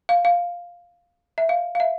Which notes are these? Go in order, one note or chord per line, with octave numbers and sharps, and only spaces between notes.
F5
F5
E5
F5
F5
E5